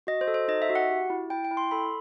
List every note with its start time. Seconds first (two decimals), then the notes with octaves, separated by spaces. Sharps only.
0.07 F#4 D#5
0.21 C5
0.28 A4
0.34 C5
0.48 D#4 D#5
0.62 E5
0.69 F#4
0.75 F#5
0.89 G4
1.10 E4
1.30 E4 G5
1.44 G5
1.51 E4
1.57 C6
1.71 A4 B5